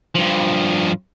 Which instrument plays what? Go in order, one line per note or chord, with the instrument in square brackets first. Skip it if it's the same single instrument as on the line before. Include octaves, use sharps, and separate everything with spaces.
[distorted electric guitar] G2 F3